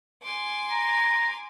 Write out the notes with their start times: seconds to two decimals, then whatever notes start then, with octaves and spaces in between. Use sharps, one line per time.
0.22 G#5 C6 D6
0.71 A#5